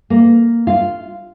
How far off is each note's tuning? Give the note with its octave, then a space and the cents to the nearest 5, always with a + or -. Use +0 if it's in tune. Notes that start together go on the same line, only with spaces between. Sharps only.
A#3 -5
F4 -5